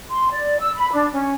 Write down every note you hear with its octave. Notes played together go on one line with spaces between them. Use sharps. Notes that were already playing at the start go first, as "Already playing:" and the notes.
C6
D5
E6
B5
D4
C#4